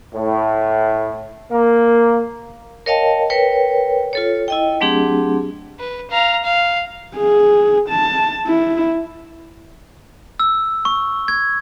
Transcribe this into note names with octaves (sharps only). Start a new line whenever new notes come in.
A2
A#3
A#4 C#5 D#5 F5 G5 A5
A#4 B4 C#5 G5
F4 A4 C#5
E4 D#5 G5
F#3 A3 C4 D4 G4 G#4
B4
F5 A#5
F5
G#4
A5
E4
E6
C#6
G#6